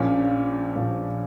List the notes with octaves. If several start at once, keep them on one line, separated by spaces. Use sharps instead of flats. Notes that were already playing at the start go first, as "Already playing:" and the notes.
Already playing: A#1 A#2 F3 C#4
A#1 A#2 F3